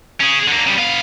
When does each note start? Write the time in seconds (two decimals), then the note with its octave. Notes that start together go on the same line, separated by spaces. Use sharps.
0.20 C#4 G#4
0.47 D3 A#3
0.67 C#3 G3
0.78 B3 F5